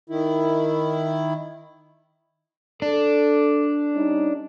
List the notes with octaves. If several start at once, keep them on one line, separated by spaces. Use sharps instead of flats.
D#3 E4
D4 A4
G3 C#4 D#4